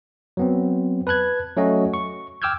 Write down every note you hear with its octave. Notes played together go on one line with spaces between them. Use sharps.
F#3 B3 C4
B4 A5 F#6 G#6
F#3 A3 C#4 F#4 D#5
C#6
G5 D6 E6 F6 G6 G#6